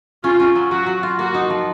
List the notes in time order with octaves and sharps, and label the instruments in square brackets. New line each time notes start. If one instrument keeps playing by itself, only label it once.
[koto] C#4 [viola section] F4
[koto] C#4
F#3
[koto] F#3 [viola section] F#4
[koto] F#3
F4
[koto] A#3 [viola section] F#4
[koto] D#4
F3